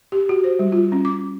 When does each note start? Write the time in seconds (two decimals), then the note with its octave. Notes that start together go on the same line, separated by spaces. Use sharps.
0.12 G4
0.29 F#4
0.44 C5
0.59 G3
0.72 F4
0.92 C#4
1.05 D6